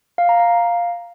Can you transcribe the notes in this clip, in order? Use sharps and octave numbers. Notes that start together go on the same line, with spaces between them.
F5
A#5
F5